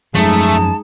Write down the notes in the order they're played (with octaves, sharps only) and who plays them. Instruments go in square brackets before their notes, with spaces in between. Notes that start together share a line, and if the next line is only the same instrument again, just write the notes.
[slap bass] F#2 F3 [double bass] G#3 D#4 [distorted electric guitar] A3 [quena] A5